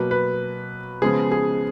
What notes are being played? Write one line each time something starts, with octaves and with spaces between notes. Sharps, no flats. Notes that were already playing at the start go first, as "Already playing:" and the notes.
Already playing: B2 F#3 A#3 B4
B4
C#3 F3 G#3 B3 G#4
G#4